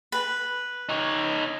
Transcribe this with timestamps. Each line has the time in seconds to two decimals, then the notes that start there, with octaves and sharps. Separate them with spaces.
0.12 B4
0.89 D#4 C#5